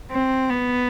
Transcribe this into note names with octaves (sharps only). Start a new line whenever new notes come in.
C4
B3